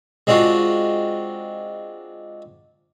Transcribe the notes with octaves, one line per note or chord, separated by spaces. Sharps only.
G#3 C4 D4 F4 F#4